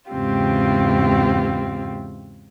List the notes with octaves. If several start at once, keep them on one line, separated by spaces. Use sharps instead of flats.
E2 G#2 C#3 C4 F4 G4